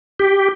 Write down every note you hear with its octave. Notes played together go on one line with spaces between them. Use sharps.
G4